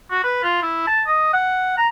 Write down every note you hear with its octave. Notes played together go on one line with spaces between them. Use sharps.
F#4
B4
F4
E4
A5
D#5
F#5
A#5